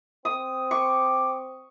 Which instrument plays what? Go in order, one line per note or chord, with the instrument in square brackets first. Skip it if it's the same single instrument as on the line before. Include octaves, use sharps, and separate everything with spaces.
[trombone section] C4 [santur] D#6
[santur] C#6 [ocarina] D6